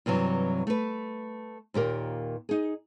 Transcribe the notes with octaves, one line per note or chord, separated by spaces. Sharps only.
G2 C3 E3 F#3
A3 B4
D#2 A#2 G4 A#4
D#4 G#4